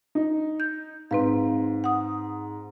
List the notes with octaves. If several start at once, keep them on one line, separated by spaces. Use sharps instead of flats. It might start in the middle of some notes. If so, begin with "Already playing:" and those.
D#4
G6
G#2 C4 B4 F5
F#5 D#6